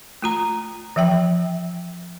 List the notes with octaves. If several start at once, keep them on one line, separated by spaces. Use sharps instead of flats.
A3 F4 A#5
E3 F3 E5 G5